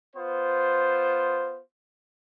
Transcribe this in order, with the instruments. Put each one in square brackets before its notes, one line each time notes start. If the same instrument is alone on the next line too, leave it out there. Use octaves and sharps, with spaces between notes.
[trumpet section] B3 F4 C5